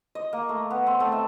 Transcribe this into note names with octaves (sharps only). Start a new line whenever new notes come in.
D#5
A#3
A3
B3
C4
A3
E5